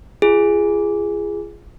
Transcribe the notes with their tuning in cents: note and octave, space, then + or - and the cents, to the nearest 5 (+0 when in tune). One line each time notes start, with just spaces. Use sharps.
F4 -30 G#4 -5